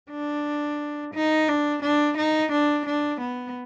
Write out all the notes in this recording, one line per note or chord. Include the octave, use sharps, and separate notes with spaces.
D4
D#4
D4
D4
D#4
D4
D4
B3